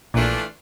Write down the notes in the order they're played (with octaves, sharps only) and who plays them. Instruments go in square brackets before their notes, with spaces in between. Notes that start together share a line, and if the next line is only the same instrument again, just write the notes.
[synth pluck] A#1 A#2 [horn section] E3 A3 D4 F4